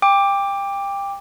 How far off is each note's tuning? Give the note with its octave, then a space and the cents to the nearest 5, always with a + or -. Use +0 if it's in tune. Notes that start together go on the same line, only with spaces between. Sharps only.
G5 +25 D6 +0